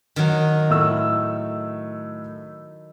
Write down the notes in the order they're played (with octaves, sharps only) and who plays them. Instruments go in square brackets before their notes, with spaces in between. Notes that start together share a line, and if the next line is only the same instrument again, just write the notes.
[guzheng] D#3 F#3
[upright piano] A2 A3 E6